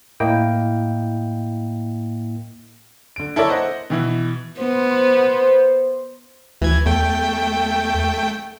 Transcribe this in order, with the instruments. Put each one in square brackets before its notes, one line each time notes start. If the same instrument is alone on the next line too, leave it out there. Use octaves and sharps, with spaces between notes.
[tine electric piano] A2 A#3 E4 D#5 G5
[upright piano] D3 D7
E4 A4 A#4 C#5 D5 E5
C5 D#5 F#5
B2 E3 E4
[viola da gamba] B3 [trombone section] C5
[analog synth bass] D2 [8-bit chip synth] E3 G#6
[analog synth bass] E2 [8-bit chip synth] A3 G5